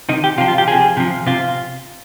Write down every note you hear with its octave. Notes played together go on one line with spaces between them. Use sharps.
C3 D#3 D#4
G4
C3 F3 F4
F4
G4
C3 F3 G#4
C3 F3
C3 F4